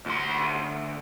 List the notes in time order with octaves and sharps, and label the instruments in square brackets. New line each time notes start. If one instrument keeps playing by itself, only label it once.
[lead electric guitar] D2 C6